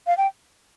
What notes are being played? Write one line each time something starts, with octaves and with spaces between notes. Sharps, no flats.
F5
G5